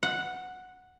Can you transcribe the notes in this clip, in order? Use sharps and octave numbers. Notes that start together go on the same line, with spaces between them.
F#5